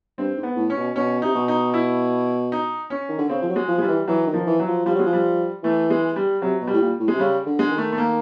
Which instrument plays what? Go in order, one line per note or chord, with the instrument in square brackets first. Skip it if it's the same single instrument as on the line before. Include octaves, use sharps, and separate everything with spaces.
[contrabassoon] G2 [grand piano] C4
[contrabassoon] G#2
[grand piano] B3
[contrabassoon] A2
[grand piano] C#4
[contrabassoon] B2
[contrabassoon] B2 [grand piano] C#4
[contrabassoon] C3 [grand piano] D#4
[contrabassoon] B2
[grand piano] D#4
E4
D#4
C#4
[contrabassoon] D#3
D3
[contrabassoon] C#3 [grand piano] C4
[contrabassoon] F3
F#3
[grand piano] G#3
[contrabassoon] F3
[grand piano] G#3
[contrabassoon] F3 [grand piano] G3
[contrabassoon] E3
[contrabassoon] E3 [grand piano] F#3
[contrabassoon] D#3
[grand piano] F3
[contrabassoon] E3
[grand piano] F#3
[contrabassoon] F3
[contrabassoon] F3 [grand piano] G3
[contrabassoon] F#3 [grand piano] G#3
[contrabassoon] F3
[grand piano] G3
[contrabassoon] E3 [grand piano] A3
[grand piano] G#3
G3
[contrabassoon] C3 [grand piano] F#3
[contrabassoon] B2
[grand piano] G3
[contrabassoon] A2
A#2
A2
[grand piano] G#3
[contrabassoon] C3
[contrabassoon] C#3 [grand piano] G3
[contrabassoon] D3
[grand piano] G#3
[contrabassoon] D3
D#3
[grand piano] A3
A3
A#3